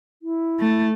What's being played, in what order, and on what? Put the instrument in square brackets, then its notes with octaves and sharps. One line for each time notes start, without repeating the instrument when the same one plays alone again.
[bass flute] E4
[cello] A3